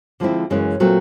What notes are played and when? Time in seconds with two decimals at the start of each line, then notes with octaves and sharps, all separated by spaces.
0.20 D3 F3 G#3 C4 E4
0.50 F#2 C#3 E3 G#3 C#4
0.80 A#2 F#3 A3 C4